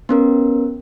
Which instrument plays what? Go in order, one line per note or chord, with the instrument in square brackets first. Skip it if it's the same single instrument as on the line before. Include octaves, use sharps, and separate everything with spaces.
[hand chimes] B3 C#4 A#4